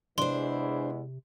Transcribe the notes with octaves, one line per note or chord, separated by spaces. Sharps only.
E2 C3 E3 G#3 D4 C5 C6